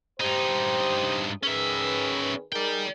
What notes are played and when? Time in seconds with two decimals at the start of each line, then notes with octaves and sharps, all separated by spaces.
0.20 G2 D#4 G4 C5
1.43 D#3 C#4 G#4 B4 E5
2.52 D#4 G#4 A#4 D5 G5